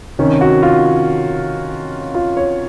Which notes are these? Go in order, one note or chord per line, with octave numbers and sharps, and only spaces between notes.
C3 D#3 C#4
F#4
F4
F4
C#5